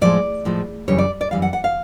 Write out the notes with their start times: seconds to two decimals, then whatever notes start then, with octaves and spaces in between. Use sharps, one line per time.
0.01 A2 F3 G#3 D5
0.45 A2 F3 G#3
0.88 F#2 C#3 E3 G3 C#5
0.98 D5
1.21 D5
1.31 F#2 C#3 E3 G3 F5
1.42 F#5
1.53 F#5
1.64 F5